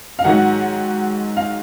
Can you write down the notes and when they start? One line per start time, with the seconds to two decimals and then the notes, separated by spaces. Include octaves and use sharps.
0.19 F5
0.24 G#2 D#3 F#3 F#5
1.37 F5